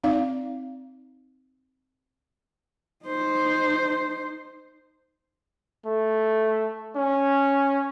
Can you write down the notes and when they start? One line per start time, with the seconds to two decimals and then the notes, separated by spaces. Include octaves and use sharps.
0.04 C4 D#4 D5 F5
3.05 D#4 C5
5.86 A3
6.96 C#4